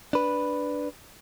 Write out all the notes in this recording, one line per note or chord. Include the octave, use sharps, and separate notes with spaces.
D4 B4